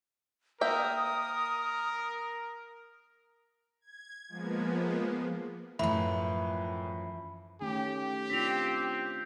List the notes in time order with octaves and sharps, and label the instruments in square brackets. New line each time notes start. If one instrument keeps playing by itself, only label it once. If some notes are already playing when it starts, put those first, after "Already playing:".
[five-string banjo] A#3 E5 G5 [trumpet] A#4 [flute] D#6
[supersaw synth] G#6
F3 G#3 A#3 B3
[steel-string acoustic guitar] F#2 F3 [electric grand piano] A2 E3 [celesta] E5 [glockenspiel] B5
[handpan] D#3 A3 C#4 [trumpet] G4
[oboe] C4 [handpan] D4 F4 [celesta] B6 F7